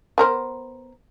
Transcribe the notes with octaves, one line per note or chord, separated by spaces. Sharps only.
B3 A#4 C5